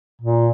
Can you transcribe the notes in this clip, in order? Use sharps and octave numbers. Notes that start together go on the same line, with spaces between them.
A#2